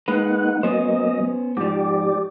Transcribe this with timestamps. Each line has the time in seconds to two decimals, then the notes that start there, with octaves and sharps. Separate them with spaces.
0.08 G#3 A#3 D#4 B4 F#5
0.63 F#3 A#3 B3 C#4 C5 D#5
1.57 G#2 F3 G4 D5